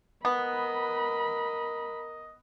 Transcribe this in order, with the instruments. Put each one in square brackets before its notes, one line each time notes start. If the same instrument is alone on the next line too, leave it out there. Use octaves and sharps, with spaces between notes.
[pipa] B3 [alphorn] A#4 [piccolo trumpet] D#5 [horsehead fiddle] B5